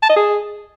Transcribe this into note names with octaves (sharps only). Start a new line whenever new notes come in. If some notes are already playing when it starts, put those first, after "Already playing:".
A5
D#5
G#4